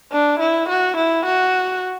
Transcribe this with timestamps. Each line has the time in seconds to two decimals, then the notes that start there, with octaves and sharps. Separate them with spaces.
0.12 D4
0.41 E4
0.69 F#4
0.97 E4
1.26 F#4